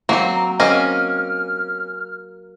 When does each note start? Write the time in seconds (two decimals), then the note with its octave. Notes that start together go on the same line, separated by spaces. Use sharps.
0.09 F#3 A#3 C4
0.35 A#5
0.60 A#3 C4 C#4 D#5 F6